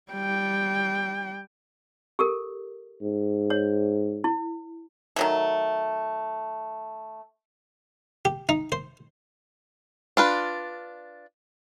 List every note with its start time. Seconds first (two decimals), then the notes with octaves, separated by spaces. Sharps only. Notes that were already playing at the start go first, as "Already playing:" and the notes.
0.12 G3 G5
2.19 G4 A4 A#4
3.02 G#2
3.50 C#5
4.24 E4
5.16 D#3 F#3 A3
8.25 G4
8.49 D#4
8.72 C5
10.17 D4 F4 B4